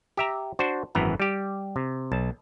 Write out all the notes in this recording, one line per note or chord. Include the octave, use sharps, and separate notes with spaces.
G4 E5 A#5
D4 F#4 C5
G#1 F#2 E3 B3 A#5
G3 G4
C3
B1 A5